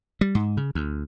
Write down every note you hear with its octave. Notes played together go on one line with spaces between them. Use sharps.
G3
G#2
C#3
D2